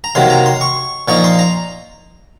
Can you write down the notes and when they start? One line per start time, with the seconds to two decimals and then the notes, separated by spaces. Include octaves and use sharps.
0.04 A#5
0.15 C3 D#3 F#3 A#3 C6
0.30 A#5
0.46 C6
0.61 C#6
1.08 A#2 F3 A#3 D#4 C#6
1.24 C6
1.39 A#5